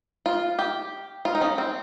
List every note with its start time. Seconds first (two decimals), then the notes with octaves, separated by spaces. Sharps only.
0.26 F4
0.59 G4
1.25 F4
1.35 D#4
1.41 C#4
1.58 C4